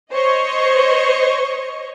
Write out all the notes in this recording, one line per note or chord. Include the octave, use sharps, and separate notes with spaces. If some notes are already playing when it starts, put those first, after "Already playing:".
C5 C#5 D#5 C#6